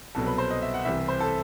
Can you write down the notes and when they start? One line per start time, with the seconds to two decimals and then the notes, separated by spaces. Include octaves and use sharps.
0.15 C2 B2 F#3 A4
0.27 B4
0.38 C5
0.50 D#5
0.62 E5
0.74 F#5
0.85 C2 C3 E3 G3 E5
1.08 C5
1.20 A4